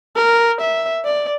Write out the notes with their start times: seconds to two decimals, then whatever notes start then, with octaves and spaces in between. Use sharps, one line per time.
0.16 A#4
0.61 E5
1.05 D5